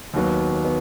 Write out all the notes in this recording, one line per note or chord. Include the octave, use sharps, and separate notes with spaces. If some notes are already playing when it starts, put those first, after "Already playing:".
D#2 D#3 F#3 B3
B3